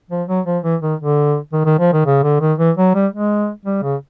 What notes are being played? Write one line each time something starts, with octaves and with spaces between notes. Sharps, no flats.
F3
F#3
F3
E3
D#3
D3
D#3
D#3
F3
D#3
C#3
D3
D#3
E3
F#3
G3
G#3
G3
C#3